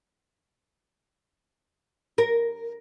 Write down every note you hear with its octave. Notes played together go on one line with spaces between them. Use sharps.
A#4